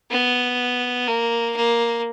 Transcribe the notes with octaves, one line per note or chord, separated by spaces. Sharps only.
B3
A#3
A#3